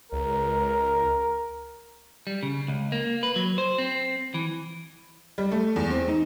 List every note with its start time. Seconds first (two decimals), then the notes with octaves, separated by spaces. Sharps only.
0.12 C#2 A#4
2.27 G3
2.43 C#3
2.68 C#2
2.92 A#3
3.23 B4
3.36 F#3
3.58 C5
3.78 C4
4.34 E3
5.38 G3
5.52 A3
5.76 E2
5.90 C4
6.08 D#4